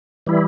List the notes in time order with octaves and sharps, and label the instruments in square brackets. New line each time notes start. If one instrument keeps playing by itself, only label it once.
[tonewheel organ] E3 G3 E4